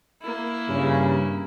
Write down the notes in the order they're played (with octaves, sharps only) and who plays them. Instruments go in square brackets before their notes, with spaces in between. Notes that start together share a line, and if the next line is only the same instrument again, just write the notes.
[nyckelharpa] A#3 E4
[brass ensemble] G2 C#3